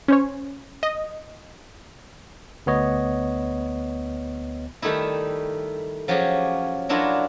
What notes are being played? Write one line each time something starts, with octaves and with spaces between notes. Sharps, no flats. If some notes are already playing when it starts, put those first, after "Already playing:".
C#4 C5 C#5
D#5
D2 B3 C#5 D#5
D#3 G3 A3 D#4 E4
F3 F#3 C#4 G4 G#4
F#3 D4 E4 F4 A#4 C#5